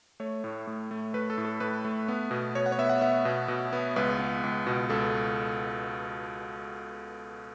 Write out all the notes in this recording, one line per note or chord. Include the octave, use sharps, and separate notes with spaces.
A3 C#5
A2
A2
A3
A3 B4
A4
A2
A4
A2 B4
A3
B3
B2
B2 C#5
F#5
C#5
B3 E5
F#5
B3 E5
B2
B2
B3
C#2 B4
B3
C#2
B2
C#2 A4